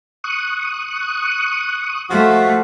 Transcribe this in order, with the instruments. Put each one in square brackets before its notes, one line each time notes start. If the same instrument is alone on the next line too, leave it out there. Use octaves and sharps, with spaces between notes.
[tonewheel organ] C#6 D#6 F#6
[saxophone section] F3 F#4 [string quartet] A3